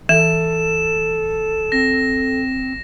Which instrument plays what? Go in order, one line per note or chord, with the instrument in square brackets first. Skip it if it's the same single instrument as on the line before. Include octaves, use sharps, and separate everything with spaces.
[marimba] E3 [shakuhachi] A4 [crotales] E7
[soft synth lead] C4 [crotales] A#6